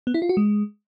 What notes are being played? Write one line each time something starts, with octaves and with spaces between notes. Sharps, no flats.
B3
E4
F4
F#4
G#3